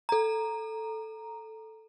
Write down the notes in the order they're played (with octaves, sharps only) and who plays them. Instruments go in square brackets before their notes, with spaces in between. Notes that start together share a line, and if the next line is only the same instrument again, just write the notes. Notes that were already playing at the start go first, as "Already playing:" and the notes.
[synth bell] A4 A#5